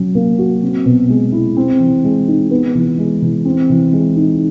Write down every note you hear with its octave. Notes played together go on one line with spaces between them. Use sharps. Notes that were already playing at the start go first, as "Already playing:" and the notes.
Already playing: F#3 C#4
A#3
F#4
C4
B2
G#3
E4
C4
E3
G#3
D#4
B3
E3
G#3
E3
C4
E3
G#3
D#4